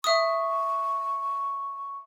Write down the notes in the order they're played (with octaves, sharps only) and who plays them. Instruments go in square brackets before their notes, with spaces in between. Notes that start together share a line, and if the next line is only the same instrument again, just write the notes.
[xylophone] E5 D#6 [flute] C#6